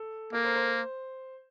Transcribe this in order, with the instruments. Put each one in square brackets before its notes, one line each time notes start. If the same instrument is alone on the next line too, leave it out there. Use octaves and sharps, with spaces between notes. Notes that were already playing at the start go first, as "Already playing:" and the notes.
Already playing: [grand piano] A4
[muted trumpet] A#3 [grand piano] A#4
[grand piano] C5
C5